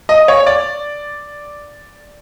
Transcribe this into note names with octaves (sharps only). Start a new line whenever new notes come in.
D#5
C#5
D5